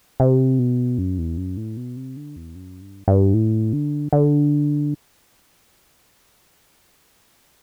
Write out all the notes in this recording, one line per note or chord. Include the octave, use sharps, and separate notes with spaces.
C3
B2
F#2
E2
F#2
A2
B2
C3
D3
E2
F#2
G2
G2
A2
D3
D3